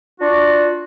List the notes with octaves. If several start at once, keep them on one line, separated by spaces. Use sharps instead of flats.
D4 F4 F#4